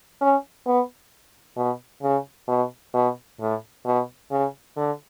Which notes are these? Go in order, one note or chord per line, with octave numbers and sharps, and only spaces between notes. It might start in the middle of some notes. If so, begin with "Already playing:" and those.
C#4
B3
B2
C#3
B2
B2
A2
B2
C#3
D3